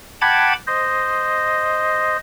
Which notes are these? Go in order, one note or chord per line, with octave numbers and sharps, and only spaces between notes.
F#5 G5 A5 B5 D6 G#6
C5 D#5